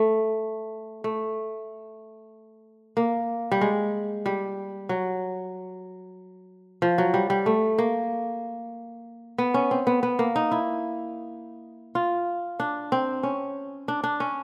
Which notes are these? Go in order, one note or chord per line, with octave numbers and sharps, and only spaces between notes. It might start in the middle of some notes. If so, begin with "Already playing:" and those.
Already playing: A3
A3
A#3
G3
G#3
G3
F#3
F3
F#3
G3
G3
A3
A#3
B3
C#4
C4
B3
B3
A#3
D#4
E4
F4
D4
C4
C#4
D4
D4
C#4